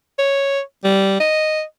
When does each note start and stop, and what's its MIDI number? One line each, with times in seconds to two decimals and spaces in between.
0.19 0.61 73
0.84 1.19 55
1.20 1.63 75